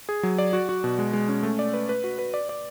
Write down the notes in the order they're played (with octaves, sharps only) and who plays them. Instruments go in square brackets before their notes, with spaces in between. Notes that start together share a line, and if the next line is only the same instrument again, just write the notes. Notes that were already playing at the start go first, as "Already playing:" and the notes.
[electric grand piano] G#4
F#3
D5
F#4
F#4
B2
G#3
G#3
C#4
A3
D5
B4
B4
F#4
B4
D5
D5